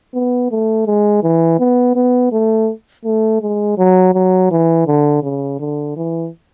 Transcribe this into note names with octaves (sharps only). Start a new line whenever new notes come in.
B3
A3
G#3
E3
B3
B3
A3
A3
G#3
F#3
F#3
E3
D3
C#3
D3
E3